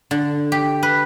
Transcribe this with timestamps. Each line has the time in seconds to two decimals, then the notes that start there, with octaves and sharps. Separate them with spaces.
0.11 D3
0.52 G4
0.83 B4